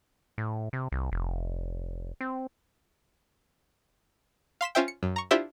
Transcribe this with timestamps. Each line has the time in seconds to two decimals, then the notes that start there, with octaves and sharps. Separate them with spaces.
0.38 A2
0.73 C3
0.92 C2
1.12 F1
2.21 C4
4.61 F5 C6 B6 E7
4.75 C#4 F4 C5 E5 G5
4.88 C#7
5.03 F#2
5.16 A#5 C#6
5.31 D4 E4 F4 G4 C5 E5